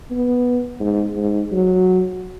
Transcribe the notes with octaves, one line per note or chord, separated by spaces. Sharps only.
B3
G#2
G#2
F#3